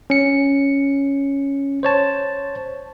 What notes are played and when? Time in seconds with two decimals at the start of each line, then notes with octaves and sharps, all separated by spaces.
0.10 C#4 C#7
1.83 C5 C#5 A5